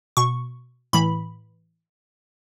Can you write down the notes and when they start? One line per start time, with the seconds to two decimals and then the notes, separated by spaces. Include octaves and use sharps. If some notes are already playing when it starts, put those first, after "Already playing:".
0.17 B2 C#6
0.93 A2 E3 B5